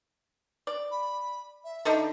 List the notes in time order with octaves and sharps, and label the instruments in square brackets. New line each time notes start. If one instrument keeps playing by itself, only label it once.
[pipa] D5
[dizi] B5
E5
[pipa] D3 D#4 A4 [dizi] E5